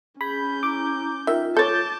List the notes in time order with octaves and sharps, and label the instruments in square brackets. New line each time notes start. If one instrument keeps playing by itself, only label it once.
[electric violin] C#4 G6 [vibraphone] G#4 [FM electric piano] B5
[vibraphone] E4 A#5 [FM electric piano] D6
[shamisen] D#3 [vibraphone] F4 [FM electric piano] E5
[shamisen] A4 C#5 [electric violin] A5 D6 [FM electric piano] G6 A6